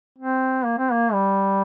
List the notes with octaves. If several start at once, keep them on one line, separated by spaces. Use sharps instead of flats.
C4
A#3
C4
A#3
G3